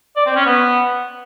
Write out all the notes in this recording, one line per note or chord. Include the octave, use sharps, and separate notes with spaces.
D5
C4
C#4
B3